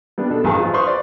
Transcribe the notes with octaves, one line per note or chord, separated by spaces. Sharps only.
G3 B3 D4
B2 D4 A4
A1 G2 G#4 A5 A#5 C#6
F3 F4
B4 C5 F5 C6 C#6 D#6
D5